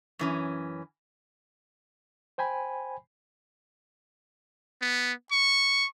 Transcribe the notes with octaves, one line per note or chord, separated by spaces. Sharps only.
F#2 E3 C#4
C5 G5 G#5 B5
B3
C#6